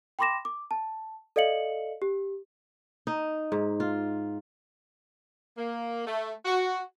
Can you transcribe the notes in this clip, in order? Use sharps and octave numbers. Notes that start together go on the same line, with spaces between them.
G5 B5 C6 D6 A#6 E7
D6
A5
A4 D5 D#5 F5 C#7 F#7
G4
D#4
G#2
F4
A#3
A3
F#4